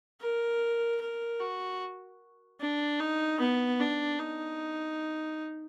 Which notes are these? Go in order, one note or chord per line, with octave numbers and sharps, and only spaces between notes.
A#4
A#4
F#4
D4
D#4
B3
D4
D#4